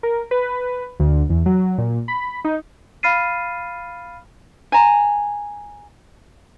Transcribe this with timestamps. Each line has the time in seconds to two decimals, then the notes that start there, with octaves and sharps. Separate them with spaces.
0.03 A#4
0.31 B4
1.00 D2
1.29 E2
1.46 F#3
1.78 A#2
2.08 B5
2.45 D#4
3.03 F5 B5 F6 A6 C7 D#7
4.72 G#5 A#5